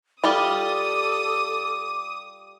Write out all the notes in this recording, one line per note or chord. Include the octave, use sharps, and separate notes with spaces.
G3 F4 G4 A4 D6 D#6